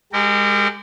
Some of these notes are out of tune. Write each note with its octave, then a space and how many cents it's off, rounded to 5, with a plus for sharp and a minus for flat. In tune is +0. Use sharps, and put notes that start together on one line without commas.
G#3 -25 G4 +0 A#4 -35